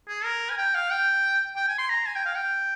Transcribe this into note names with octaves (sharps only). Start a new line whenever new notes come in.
G#4
A#4
G#5
G5
F5
G5
G5
G#5
C6
A#5
G#5
G5
F5
G5